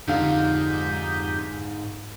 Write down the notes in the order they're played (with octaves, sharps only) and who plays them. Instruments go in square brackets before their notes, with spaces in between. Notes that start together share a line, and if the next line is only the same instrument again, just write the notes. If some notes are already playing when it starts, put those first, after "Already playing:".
[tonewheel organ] F2 D#4 G4 [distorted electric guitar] G#2 [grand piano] D3 F5